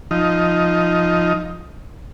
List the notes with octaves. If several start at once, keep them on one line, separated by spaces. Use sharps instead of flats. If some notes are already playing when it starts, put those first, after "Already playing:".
F3 D#4